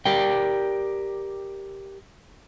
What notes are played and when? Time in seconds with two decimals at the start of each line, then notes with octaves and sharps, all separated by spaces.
0.06 G4 A#4 D5 G5